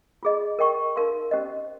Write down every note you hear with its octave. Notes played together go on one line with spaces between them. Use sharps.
F4 G#4 D#5
A#4 D#5 G5 C#6
D#4 A#4 F5 C6
C#4 G4 C5 D#5